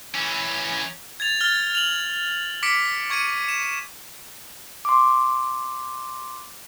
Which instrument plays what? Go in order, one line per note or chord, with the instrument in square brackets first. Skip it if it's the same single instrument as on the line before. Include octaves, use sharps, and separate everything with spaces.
[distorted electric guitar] E3 C#4
[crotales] G#6 A6 F7
F6 A6 G7
F7 F#7
D6 B6 C#7 D7
C#6 G#6 C#7 D#7
E7
[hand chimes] C6 D6